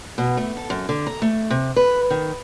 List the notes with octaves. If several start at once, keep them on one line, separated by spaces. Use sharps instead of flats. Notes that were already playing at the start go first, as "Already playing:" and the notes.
B2
A3
A4
F#2
D3
A#5
A3
C3
B4
D#3